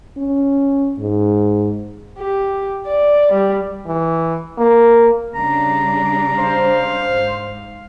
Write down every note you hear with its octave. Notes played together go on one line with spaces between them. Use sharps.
C#4
G#2
G4
D5
G3
E3
A#3
C#3 G3 D4 A#5
C5 F5
G#2